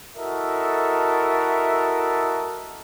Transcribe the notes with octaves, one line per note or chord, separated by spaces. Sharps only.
E4 F#4 A4 A#4 D#5 E5